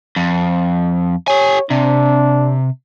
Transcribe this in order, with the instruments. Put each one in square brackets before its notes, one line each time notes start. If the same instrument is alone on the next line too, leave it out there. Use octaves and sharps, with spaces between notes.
[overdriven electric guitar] F2
[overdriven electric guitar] G4 G#5 [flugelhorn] C#5
[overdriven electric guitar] C3 [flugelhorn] D4